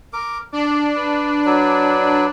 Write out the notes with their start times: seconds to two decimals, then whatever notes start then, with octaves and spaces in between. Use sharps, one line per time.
0.13 A#4 D6
0.52 D4 D6
0.96 B4
1.45 F#3 B4